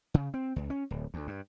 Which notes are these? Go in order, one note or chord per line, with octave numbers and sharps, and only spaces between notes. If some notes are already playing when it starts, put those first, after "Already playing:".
C#3
C4
C#2
C#4
D1
D2
G2